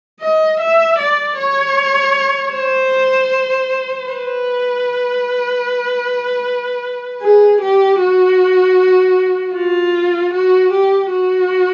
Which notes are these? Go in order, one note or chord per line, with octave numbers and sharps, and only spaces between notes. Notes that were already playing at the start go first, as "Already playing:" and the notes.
D#5
E5
D5
C#5
C5
B4
G#4
G4
F#4
F4
F#4
G4
F#4